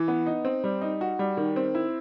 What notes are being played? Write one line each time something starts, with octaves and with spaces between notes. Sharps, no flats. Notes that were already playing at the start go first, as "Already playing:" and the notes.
Already playing: E3
B3
D#4
C4
G3
D#4
F#4
G3
D#3
C4
E4